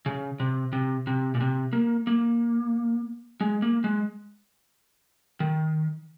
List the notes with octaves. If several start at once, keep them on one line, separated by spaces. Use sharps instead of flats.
C#3
C3
C3
C3
A#2
C3
A#3
A#3
G#3
A#3
G#3
D#3